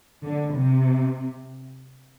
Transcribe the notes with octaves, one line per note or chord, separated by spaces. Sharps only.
D3
C3